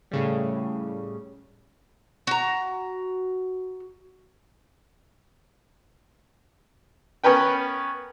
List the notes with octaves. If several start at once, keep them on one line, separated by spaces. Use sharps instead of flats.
A2 C#3 G3
F#4 A#5
B3 C#4 A#4 B4 G5